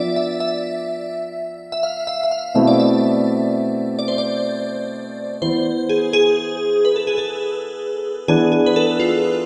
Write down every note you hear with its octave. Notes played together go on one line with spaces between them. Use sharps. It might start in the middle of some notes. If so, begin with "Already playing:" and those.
Already playing: F3 B3 D4 F4 D5 E5
E5
E5
E5
F5
E5
E5
F5
B2 A3 C4 E4 E5
D5
E5
D5
C5
D5
E3 B3 E4 C5
G#4
G#4
B4
A4
G#4
A4
E3 B3 D4 G#4
G#4
B4
A4
F4